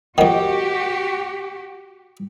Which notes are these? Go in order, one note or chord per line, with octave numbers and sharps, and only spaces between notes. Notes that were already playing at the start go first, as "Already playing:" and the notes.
F2 D#3 F#4 G4 F#5 G5